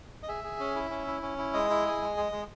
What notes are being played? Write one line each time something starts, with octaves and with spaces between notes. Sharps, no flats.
D#5
G#4 E5
G#4
C#4
E4
C#4
E4
C#4
E4
G#3 D#5
E4
G#4
G#3
G#3
G#3